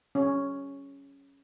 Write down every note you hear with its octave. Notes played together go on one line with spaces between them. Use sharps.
C#4